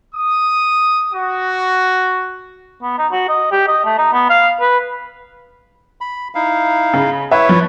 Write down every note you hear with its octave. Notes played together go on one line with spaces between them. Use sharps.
D#6
F#4
B3
D#4
F#4
D#5
G4
D#5
A3
D#4
B3
F5
B4
B5
D#4 E4 F5
C#3
E4 B4 C#5 E5
F3